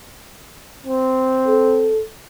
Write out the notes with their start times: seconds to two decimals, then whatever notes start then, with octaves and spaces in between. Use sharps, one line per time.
0.86 C4
1.47 A4